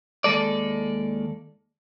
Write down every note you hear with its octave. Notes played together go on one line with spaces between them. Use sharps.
D#2 G#3 A4 D5